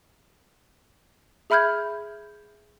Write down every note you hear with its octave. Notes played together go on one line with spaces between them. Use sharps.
G#4 E5 B5 F6 G6 G#6